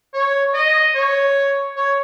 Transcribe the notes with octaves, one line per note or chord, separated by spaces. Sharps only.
C#5
D#5
C#5
C#5